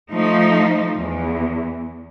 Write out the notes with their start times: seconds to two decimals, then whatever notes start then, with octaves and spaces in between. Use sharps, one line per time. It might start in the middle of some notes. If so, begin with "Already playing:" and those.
0.11 F3 A3 D#4
0.97 E2